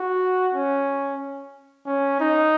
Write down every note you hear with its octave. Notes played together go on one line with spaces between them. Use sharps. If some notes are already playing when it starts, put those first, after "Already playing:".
Already playing: F#4
C#4
C#4
D#4